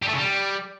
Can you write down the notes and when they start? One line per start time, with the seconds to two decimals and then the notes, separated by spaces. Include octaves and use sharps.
0.02 G3
0.08 A3
0.13 C#3
0.18 G3